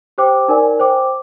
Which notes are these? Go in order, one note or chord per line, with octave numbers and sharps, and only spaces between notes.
G4 C5 G5 D6
D#4 A#4 D5 G#5
C5 G5 D6